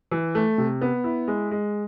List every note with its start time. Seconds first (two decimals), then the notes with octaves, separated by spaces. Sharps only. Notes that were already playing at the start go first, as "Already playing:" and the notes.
0.12 E3
0.35 A3
0.58 C3
0.81 B3
1.04 E4
1.28 G#3
1.51 G#3